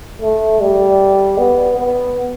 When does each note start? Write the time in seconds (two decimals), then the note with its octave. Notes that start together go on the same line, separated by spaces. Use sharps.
0.22 A3
0.61 G3
1.38 B3
1.77 B3